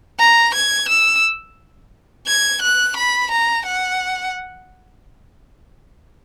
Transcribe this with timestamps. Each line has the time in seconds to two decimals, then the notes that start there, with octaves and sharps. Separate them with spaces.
0.19 A#5
0.54 G#6
0.89 E6
2.27 G#6
2.62 F#6
2.96 B5
3.31 A#5
3.65 F#5